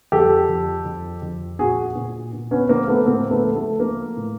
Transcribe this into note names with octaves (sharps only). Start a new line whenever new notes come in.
F2 G4 A4
F2
F2
F2
A#2 F#4 G#4
A#2
A#2
B3 C#4
F3 A#3 C4
A3 B3
A2 A#3 C4
A3 B3
F3
A3
F3 A#3
A2